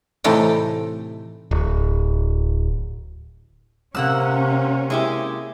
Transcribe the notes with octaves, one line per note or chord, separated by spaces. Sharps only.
A2 C3 E3 A3 D#4 G5
D1
C3 A#3 C#4 F#5 E6
G#3 E4 G4